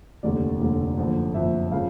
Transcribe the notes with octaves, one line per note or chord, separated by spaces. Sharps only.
F1 D#2 D3 G3 D5
F1 D#2 D3 G3
F#1 F2 D3
F#1 F2 D3 E5
C#3 F3 F5